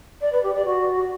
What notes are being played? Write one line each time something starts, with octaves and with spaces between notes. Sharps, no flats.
D5
B4
G4
D5
F#4